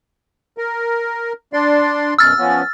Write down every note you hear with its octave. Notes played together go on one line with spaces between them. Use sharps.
A#4
D4 D5 C6
F#2 B2 E6 F6 A6
F3 B3 C#4